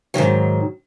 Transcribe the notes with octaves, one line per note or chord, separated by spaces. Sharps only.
G#2 C3 D#3 F#3